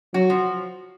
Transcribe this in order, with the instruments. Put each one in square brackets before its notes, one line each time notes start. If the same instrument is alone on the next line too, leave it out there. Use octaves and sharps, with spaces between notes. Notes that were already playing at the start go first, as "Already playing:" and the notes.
[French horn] F#3 [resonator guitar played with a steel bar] F#4
[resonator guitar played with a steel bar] F3